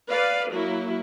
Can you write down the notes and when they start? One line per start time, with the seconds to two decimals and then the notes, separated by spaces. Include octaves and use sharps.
0.10 B4 D5 F5
0.53 F#3 A#3 E4